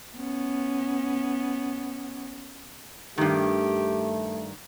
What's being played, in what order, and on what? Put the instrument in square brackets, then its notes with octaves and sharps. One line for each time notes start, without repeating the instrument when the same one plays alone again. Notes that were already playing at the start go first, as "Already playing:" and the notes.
[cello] B3 C#4
[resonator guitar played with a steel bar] G2 D#3 [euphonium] A3 [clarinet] G4